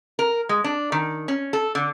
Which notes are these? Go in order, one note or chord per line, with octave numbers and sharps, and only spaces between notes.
A#4
G#3
D4
D#3
C#4
A4
D3